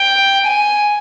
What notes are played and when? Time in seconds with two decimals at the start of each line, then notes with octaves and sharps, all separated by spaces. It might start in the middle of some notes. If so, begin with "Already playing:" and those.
Already playing: G5
0.47 G#5